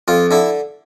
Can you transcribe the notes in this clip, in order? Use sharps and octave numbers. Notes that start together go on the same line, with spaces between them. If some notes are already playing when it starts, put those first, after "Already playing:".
F2 F4
D3 E4